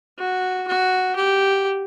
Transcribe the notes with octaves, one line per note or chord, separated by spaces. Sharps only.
F#4
F#4
G4